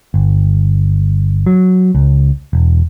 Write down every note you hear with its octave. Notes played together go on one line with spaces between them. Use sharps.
G1
F#3
C#2
E1